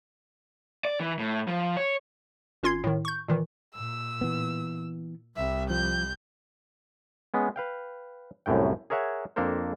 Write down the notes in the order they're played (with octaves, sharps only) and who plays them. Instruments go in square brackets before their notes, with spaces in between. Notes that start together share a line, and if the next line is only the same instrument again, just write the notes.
[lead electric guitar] D5
E3
A2
F3
C#5
[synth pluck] G#1 C#4 F4 C6 G#6 C7
A2 D#3
C#6 G6
A#2 D#3 E3
[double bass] A#2 [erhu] E6
[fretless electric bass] E3 B3
[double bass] C2 G3 [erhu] E5
[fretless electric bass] F3 [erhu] G6
[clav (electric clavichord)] G#3 B3 C#4
B4 F5 G5
C2 F#2 A2 F#3 G5
G#4 A#4 C#5 E5 F#5
F2 A#3 D4 A4 A#4 C5